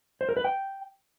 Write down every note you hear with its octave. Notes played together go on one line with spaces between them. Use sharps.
C5
A#4
B4
G5